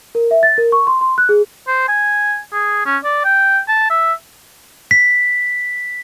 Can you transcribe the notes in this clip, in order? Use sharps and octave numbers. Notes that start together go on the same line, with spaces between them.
A#4
E5
A6
A#4
C#6
C6
C6
F#6
G#4
C5
G#5
G#4
C#4
D5
G5
A5
E5
B6